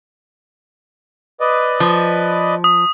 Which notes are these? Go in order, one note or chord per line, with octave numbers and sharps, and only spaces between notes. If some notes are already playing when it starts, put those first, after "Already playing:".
B4 D5 D#5
F3
D#6